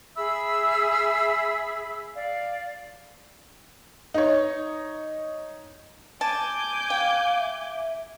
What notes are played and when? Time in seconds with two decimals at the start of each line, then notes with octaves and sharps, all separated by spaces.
0.16 G#4 E5 B5 E6
2.13 D5 F5
4.14 D#4 C#5
6.21 G#5 A5 D6 G6
6.90 F5 G5
7.39 E5